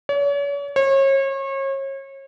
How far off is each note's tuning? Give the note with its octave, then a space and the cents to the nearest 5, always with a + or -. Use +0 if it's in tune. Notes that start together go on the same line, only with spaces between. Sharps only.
C#5 +40
C#5 -35